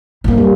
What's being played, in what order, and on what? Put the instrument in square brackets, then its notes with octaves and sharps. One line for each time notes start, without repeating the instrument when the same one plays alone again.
[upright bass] A2
[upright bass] G2 [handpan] A#3
[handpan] G3